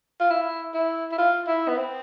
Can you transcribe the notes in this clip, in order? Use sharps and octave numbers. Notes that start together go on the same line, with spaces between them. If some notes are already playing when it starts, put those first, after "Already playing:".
F4
E4
E4
E4
F4
E4
B3
C4